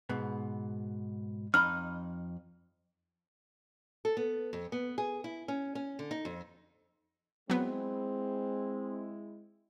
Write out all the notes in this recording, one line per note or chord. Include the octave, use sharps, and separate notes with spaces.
G#2 B2 B3
F2 D#4 B5 F6
A4
B3
F2
B3
G#4
E4
C#4
C#4
D3
D#4
F2
F#3 G#3 B3 C4 E4